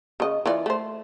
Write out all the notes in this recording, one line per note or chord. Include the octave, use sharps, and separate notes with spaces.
C#3 D#5
E3 F4 D5
A3 C5